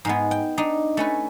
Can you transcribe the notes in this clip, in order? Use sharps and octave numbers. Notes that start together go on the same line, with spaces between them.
G#2 G#3 B3
G5
D4 D#4
A3 C#4 B4